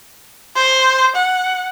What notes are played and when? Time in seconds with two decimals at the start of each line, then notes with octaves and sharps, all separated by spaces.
0.56 C5
1.15 F#5